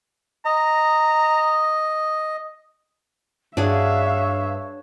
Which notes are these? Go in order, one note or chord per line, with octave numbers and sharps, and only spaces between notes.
D#5 A#5
G2 D4 F#4 G#4 C#5 E5 F5